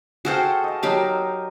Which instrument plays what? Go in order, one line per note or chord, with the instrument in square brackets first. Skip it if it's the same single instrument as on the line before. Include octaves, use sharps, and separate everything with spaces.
[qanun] F#4 A4 C5 [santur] G#4 F5 G5
[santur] D#5 A5
[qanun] F#3 G4 F5 [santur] D#4 A#4